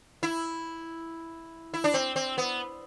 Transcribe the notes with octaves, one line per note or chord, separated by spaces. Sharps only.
E4
E4
D4
C4
C4
B3